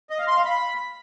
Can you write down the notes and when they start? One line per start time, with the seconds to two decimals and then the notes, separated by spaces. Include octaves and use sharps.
0.10 D#5
0.19 F5
0.28 C6
0.36 F5
0.45 B5